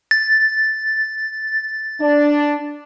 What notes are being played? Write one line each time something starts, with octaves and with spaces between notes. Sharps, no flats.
A6
D4